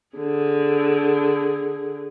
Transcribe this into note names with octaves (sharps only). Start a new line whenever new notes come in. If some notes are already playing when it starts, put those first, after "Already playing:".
D3 G#4